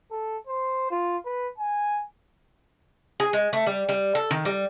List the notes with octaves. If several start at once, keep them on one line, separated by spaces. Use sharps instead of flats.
A4
C5
F4
B4
G#5
G#4
G#3
A3
G3
G3
A4
D#3
G3